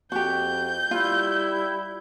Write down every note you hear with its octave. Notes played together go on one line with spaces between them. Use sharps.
F2 F#4 G4 G6
G3 E4 F4